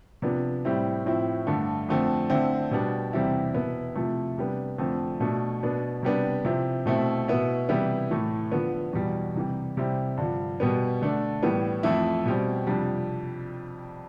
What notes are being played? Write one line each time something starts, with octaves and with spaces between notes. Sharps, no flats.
C3 F3 B3 D4
A2 G3 C4 E4
A2 F3 C4 E4
G2 D3 A3
F2 D3 A3 C4
D3 A3 C4 E4
B2 G3 B3 D4
E2 C3 G3 C4 E4
B2 B3 E4
C3 F3 A3 E4
C3 G3 B3 D4
F2 D3 A3 C4
B2 A3 D4
B2 B3 D4
C3 G3 B3 D4
C3 F3 C4 E4
B2 A3 C4 E4
B2 B3 E4
C3 E3 G3 B3 E4
A2 E3 A3
D3 F3 B3
E2 B2 G3
C3 E3 G3
C3 G3 C4 E4
G2 D3 F3
B2 G3 B3
D3 A3 D4
A2 E3 G3 B3
F2 E3 A3 E4
B2 G3 C4
F2 C3 G3 D4